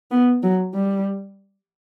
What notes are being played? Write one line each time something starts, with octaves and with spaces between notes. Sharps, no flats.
B3
F#3
G3